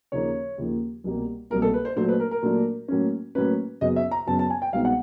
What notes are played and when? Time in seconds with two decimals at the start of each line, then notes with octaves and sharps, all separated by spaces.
0.12 D#2 C#3 F3 A#3 D#4 C#5
0.58 D#2 C#3 F3 A#3 D#4
1.04 C2 B2 G3 A#3
1.50 C2 B2 G3 A#3 A#4
1.62 A4
1.74 B4
1.85 C5
1.96 A#2 F#3 A3 D4 C5
2.09 B4
2.20 A#4
2.31 A#4
2.43 A#2 F#3 A3 D4
2.88 A2 F#3 A#3 C#4
3.35 A2 F#3 A#3 C#4 B4
3.81 F#2 C#3 F#3 B3 D#5
3.96 E5
4.11 A#5
4.27 F#2 C#3 F#3 B3 A5
4.39 A5
4.50 G#5
4.62 G5
4.73 C2 B2 G#3 B3 D#4 F5
4.85 F#5